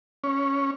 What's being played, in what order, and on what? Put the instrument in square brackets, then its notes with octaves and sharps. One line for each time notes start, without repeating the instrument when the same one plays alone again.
[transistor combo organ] C#4